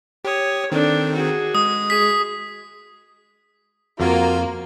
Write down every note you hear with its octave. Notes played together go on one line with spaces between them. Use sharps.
G4 C#5 D#6
D#3 C4 D4 A4
F#4 G#4
G#3 D#6
G#4 B6
F2 A#3 F4 F#4